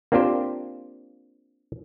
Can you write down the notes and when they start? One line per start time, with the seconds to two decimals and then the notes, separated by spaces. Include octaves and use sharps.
0.12 A#3 C4 D4 F4 G4 C5